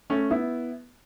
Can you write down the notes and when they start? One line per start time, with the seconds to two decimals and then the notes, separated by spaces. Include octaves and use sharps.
0.10 A3 C#4
0.30 B3 E4